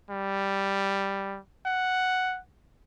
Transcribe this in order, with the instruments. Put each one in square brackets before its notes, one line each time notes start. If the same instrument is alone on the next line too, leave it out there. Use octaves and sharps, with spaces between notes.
[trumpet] G3
F#5